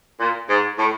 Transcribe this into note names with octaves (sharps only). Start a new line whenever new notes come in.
A#2
G#2
A2